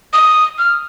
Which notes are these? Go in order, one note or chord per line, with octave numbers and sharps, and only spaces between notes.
D#6
F6